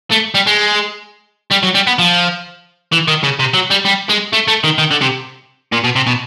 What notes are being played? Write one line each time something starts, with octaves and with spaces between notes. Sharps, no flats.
A3
G3
G#3
G3
F#3
G3
B3
F3
E3
D#3
C#3
C3
F#3
G3
G3
G#3
A3
A3
D#3
D#3
D3
C3
A#2
B2
C3
B2